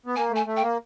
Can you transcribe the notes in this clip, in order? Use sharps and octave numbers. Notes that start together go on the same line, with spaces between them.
B3
A#3 G#5
A3 G#5
A3
G5
A#3